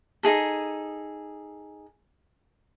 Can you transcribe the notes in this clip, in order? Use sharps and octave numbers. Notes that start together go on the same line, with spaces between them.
D#4 F4 G#4 A4